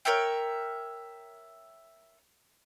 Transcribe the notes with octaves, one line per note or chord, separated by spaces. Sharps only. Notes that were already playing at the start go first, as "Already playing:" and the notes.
A#4 C#5 E5 G5